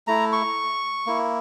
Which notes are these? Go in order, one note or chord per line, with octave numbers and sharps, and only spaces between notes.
A3 E4 A#5
C#6
A#3 E4